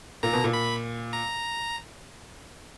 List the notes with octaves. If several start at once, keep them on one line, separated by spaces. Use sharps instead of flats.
A#2 A#5
B2
A#2
B5
A#5